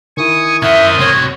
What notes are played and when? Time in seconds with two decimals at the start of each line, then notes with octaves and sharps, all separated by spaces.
0.17 D#3 E4 G#5 C#6 D#6
0.63 C#4 A#4 C5 E5 F#5 D#6
1.00 C4 F#4 C#5